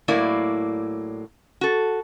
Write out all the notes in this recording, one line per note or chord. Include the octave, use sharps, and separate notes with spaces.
A2 F#3 A#3 E4 D5
F#4 A4